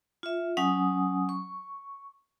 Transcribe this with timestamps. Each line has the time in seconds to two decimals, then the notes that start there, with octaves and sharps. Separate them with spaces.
0.23 F4 E5
0.57 F#3 C#4 F#5 G#5 D#6
1.29 C#6